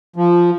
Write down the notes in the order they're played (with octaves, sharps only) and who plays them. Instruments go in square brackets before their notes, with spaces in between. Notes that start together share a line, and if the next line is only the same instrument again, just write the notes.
[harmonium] F3